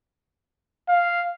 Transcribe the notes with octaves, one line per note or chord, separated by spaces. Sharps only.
F5